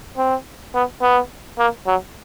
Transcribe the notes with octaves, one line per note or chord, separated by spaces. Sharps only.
C4
B3
B3
A#3
F#3